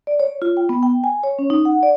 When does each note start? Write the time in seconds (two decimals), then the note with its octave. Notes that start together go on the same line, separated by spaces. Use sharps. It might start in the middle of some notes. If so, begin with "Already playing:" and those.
0.07 D5
0.20 C#5
0.42 F4
0.57 G5
0.69 B3
0.83 G5
1.04 G#5
1.24 C#5
1.39 C#4
1.50 D#4
1.65 F#5
1.83 D5